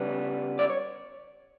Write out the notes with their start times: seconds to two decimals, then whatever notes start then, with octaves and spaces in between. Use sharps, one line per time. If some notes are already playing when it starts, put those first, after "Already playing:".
Already playing: C#3 G3 B3
0.59 D5
0.70 C#5